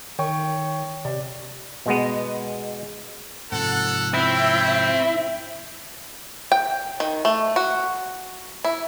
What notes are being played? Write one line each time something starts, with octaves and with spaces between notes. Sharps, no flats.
D#3 C#5 G5 C#6
C3 D5
B2 G#3 B3
G#2 C3 F3 A4 F#5
C4 C#4 E4 E5 G5
G5
D#3
A3
F#4
E4